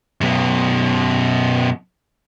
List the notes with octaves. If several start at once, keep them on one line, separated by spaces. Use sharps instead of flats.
F#2 B2